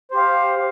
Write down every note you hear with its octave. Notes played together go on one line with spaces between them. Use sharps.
G4 C5 F5